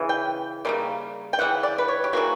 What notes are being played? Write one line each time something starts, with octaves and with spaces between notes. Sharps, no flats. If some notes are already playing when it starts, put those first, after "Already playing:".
Already playing: C#3 E3
G5
C#3 E3 G3 A#3
G5
C#3 E3 F#5
D5
B4
C#5
G4
C#3 E3 G3 A#3 F#4